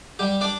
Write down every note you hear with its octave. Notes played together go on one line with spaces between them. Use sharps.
G3 G4
D4 D5